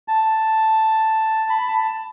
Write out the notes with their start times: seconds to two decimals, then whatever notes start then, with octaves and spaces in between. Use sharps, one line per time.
0.08 A5
1.50 B5
1.68 A5